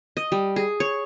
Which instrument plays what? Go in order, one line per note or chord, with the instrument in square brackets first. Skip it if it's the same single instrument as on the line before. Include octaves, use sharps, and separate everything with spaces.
[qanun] D#5
G3
G#4
C#5